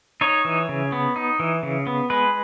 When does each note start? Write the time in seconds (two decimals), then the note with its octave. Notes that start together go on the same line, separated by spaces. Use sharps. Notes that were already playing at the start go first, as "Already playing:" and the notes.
0.21 D#4 C#5
0.45 E3
0.69 C#3
0.92 B3
1.16 D#4
1.40 E3
1.63 C#3
1.87 B3
2.10 G#3 B4